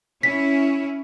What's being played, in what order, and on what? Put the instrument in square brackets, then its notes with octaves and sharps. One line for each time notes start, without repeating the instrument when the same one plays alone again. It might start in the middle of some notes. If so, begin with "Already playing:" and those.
[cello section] C#4 E4 [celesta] B6